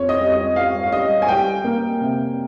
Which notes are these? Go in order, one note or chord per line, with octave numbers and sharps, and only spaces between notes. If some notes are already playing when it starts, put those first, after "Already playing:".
Already playing: F2 C#5
D#5
G3
D#5
G3 F5
F5
G3 D#5
G#5
G3 G5
A#3
C3